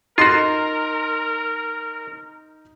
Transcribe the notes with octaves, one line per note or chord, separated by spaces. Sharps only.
D#4 F4 F#4 A#4 C6 C7